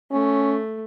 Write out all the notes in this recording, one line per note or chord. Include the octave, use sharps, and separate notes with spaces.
A3 C#4